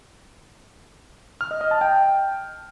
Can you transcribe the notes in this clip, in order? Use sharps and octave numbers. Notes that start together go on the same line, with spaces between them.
F6
D#5
D#5
A5
G5